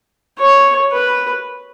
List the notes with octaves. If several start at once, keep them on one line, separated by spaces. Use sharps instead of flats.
C#5
B4